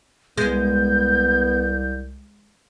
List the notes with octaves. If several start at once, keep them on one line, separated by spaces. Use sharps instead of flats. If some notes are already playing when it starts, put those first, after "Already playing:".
C2 G#3 B3 G6